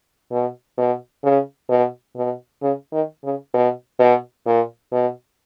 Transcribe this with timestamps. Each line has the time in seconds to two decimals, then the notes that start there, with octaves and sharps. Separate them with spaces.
0.31 B2
0.78 B2
1.24 C#3
1.69 B2
2.16 B2
2.62 C#3
2.92 D#3
3.24 C#3
3.54 B2
3.99 B2
4.46 A#2
4.92 B2